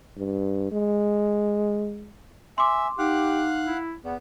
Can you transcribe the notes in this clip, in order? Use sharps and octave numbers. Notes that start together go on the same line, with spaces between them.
G2
G#3
E5 G#5 C6 D6
D#4 G4 F5 F#5 F#6
E4
E2 B3